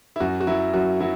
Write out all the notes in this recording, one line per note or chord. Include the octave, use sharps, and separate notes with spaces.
E4
F#2 F#4
F#4
F#3 E4
F#2 F#4
F#3 E4